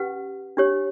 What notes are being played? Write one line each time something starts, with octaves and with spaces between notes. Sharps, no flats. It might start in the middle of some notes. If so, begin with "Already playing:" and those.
Already playing: C#4 G4 B4 F#5
D4 G4 C#5